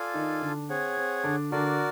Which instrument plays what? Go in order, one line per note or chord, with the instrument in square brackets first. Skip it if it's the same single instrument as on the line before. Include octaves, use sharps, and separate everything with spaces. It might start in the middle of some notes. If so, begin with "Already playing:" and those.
Already playing: [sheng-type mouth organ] F4 A4 D5 F5 G#5
[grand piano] D#3 D#4
D3 D4
[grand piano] C4 [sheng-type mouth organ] G#4 C#5 F#5
[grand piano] C4
D3 D4
[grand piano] D3 D4 [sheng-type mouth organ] F#4 A#4 D5